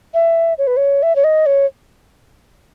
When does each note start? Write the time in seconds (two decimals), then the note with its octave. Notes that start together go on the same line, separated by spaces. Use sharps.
0.14 E5
0.58 C#5
0.67 B4
0.77 C#5
1.03 E5
1.16 C#5
1.24 D#5
1.46 C#5